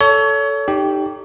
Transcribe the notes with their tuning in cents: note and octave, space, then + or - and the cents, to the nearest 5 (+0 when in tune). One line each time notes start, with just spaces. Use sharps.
A4 +0 C#5 +30
D#4 -15 G4 +0